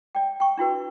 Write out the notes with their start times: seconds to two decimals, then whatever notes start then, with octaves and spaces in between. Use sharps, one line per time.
0.15 D5 G5
0.40 G5 C#6
0.57 D4 E4 F#4 B4